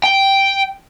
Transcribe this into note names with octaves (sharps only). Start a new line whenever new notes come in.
G5